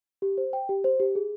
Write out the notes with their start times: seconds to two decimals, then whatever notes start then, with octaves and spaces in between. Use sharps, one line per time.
0.22 G4
0.38 C5
0.53 G5
0.69 G4
0.84 C5
1.00 G4
1.15 G#4